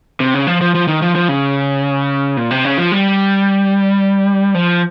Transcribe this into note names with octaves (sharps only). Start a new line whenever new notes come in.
C3
C#3
F3
F3
F3
D#3
F3
F3
C#3
A#2
C3
C#3
F3
G3
F3